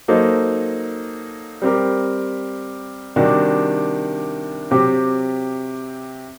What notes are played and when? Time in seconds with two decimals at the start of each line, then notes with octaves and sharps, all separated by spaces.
0.08 F#3 A#3 D#4 A4 C5
1.62 G3 C4 G4 A#4
3.16 C3 D#3 G3 D4 F#4
4.71 C3 F#3 C4 G4 C5